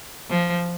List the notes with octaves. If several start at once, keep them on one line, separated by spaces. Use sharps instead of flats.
F3